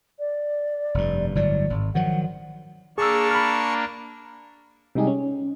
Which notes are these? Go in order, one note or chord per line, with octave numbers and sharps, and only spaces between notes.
D5
F1 G2
G1 A2 F#3 D5
G#1
D#3 F3 F#3 F#5
A#3 D4 G#4 A5 C#6 E6
B5 F6
C3 G3 G#3 D#4 G4 G#4
C#4